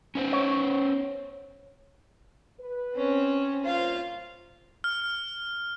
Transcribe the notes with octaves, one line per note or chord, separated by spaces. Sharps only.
C#4 B4 C5
C#5
B4
C4 C#4
G2 A#2 F4 C5 F5
F6